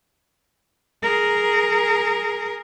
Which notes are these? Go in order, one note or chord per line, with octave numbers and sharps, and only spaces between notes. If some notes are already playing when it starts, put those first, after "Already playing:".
G#4 A#4